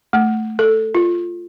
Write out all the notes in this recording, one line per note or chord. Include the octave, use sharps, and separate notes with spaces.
A3
A4
F4